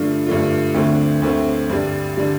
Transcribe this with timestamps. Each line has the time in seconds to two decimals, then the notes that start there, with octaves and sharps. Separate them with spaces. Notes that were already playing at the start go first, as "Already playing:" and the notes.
Already playing: G2 D3 A3 D4 F4
0.27 G2 D3 A3 D4 F4
0.74 D2 D3 A3 C4
1.22 D2 D3 A3 C4
1.70 G2 D3 G3
2.17 D3 G3